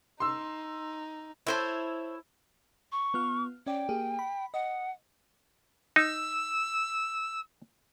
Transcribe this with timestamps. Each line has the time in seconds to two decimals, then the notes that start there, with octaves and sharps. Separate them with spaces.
0.20 D#4 C6 E6
1.47 E4 A4 C5 C#5
2.92 C#6
3.14 B3 F4 F6
3.66 C#4 D5 G5
3.89 A#3 G4 G#4
4.19 B5
4.54 D#5 F#5
5.96 D#4 E6